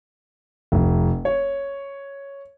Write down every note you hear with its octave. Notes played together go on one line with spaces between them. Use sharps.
F1
C#5